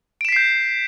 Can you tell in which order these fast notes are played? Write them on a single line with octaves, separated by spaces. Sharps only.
D7 E7 B6 C7 G6